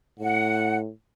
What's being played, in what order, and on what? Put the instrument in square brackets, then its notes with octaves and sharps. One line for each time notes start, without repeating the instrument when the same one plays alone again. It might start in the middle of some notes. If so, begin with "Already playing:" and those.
[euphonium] A2 [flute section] F#5